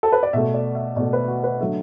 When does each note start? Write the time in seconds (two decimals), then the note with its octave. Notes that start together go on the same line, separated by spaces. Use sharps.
0.03 A4
0.12 B4
0.23 D5
0.33 B2 A3 E5
0.54 D5
0.75 E5
0.96 B2 A3 D5
1.13 B4
1.28 F#4
1.44 B4
1.60 D3 F#3 A3 E5